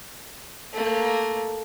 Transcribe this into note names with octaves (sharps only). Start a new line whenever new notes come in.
A3 A#3